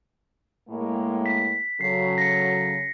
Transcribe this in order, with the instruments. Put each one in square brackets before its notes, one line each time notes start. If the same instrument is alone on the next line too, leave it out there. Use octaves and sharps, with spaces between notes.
[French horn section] A2 G#3 A#3
[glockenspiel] B6
[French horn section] C#3 F#3 A4 [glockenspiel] C7
[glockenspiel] A#6 C#7